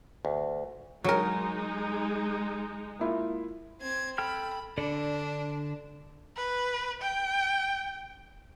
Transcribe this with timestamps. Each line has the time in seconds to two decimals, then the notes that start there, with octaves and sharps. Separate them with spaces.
0.25 D2
1.04 F#3 G#3 D#4 A#4
2.99 A#3 E4 F4
3.81 C4 G#6
4.18 A4 G5 B5 F6
4.78 D3 D4 A4 D5
6.36 B4
7.02 G5